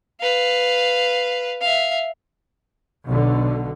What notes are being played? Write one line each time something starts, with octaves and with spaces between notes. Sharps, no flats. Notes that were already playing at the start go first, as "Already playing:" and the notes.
B4 F5
E5 F5
B1 B2 D3